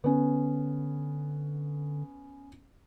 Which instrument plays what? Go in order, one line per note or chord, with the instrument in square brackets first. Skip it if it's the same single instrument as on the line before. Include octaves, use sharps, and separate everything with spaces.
[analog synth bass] D3 [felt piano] B3 C#4